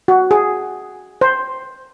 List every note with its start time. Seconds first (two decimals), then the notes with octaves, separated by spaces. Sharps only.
0.08 F#4
0.31 G#4
1.21 C5